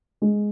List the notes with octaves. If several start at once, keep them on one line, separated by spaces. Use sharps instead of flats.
G#3